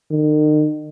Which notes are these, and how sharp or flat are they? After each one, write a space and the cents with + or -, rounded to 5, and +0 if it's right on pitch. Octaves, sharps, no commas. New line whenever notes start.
D#3 -40